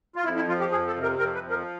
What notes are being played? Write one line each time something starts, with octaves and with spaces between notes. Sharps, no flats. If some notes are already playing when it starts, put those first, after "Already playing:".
F4
F2 E4
E4
F3 F4
G4
F2 G#4
A4
C3
A#4
F2 A#4
B4
F3
A#4